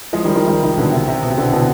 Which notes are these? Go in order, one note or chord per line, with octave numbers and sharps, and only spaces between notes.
F3 G#3
D#3 G3
D#3 G3
D#3 G3
C3 D#3
B2 D3
C3
C3
B2
C3
B2 D3
B2 D3